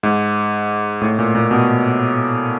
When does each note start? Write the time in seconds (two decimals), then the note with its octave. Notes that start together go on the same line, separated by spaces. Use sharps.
0.03 G#2
1.01 A2
1.19 A#2
1.35 A#2
1.51 B2